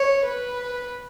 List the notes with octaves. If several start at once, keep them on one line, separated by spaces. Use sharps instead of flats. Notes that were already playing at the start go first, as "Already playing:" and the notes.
Already playing: C#5
B4